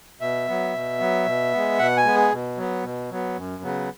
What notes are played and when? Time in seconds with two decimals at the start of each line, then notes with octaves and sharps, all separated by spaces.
0.20 B2 E5
0.48 F#3 B3
0.74 B2
0.99 F#3 B3
1.26 B2
1.52 B3
1.57 G#3
1.79 B2 F#5
1.97 G#5
2.05 G#3 B3
2.15 G#4
2.32 B2
2.57 F#3 B3
2.84 B2
3.11 F#3 B3
3.37 F#2
3.63 C#3 F#3 B3